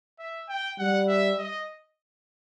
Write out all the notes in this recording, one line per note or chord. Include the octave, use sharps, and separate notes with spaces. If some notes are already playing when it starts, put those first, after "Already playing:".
E5
G5
G3 F#5
E5
D#5